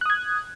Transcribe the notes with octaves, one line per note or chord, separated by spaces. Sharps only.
D#6 F#6 G#6